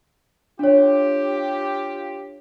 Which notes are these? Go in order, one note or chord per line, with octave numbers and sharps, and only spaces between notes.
D4 F4 G4 C#5